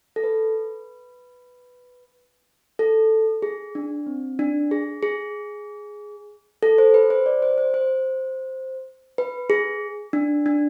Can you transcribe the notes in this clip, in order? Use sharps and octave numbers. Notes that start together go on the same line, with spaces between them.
A4
B4
A4
G#4
D4
C4
D4
G#4
G#4
A4
C5
B4
C5
D5
C5
C5
C5
B4
G#4
D4
D4